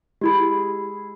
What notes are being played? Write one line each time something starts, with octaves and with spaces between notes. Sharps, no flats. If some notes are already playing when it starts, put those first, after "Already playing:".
G#3 E4 G4 G#4 B5